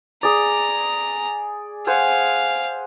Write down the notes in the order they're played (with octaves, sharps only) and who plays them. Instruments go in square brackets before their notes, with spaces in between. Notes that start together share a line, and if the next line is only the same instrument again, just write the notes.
[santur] G#4 D5 [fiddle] A#5
[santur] C5 F#5 G#5 [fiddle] F5